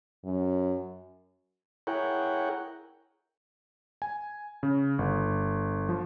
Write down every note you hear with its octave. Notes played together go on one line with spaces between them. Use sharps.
F#2
E4 G#4 A#4 C#5 F#5 G5
G#5
C#3
G1
F3